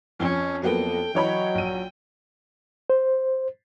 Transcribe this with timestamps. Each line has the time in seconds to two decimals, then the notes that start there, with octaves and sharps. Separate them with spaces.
0.20 F2 F3 C#4
0.63 F2 F#3 A#3 B3 A4 G5
1.15 E3 F#3 C#5 D#5 B5
1.55 A#1 D#7
2.90 C5